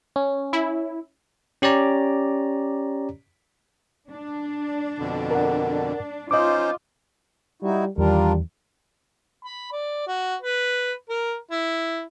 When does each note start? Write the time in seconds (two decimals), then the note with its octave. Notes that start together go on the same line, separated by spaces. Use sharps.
0.16 C#4
0.53 E4
1.62 C#4 G4 C#5 D5 A#5
4.11 D4
4.98 F2 B2 D3
5.31 A#4 F#5
6.31 C#4 D#4 F4 C5 D#5 D6
7.62 G3 D#4 E4 F#4
7.98 E2 D#3 G3 D4 F4 A#4
9.44 B5
9.72 D5
10.07 F#4
10.42 B4
11.09 A#4
11.51 E4